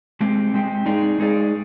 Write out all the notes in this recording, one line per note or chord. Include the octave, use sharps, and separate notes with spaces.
G#3 C4 G4
G#3 C4 G4
G#3 D#4 G#4 D5
G#3 D#4 G#4 D5